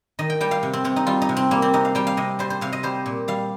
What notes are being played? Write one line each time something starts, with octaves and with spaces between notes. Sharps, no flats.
D#3 D#5
G5
G3 G5
F5
C3
C4
C3 C4
D#4
G3 F4
D#4
C3
C4
G3 A#3
C4
C3 D#4
F5
G3 G5
F5
C3 D#5
G3 C5
C5
C3 F5
D#5
G3 C5
A#2
G3 F5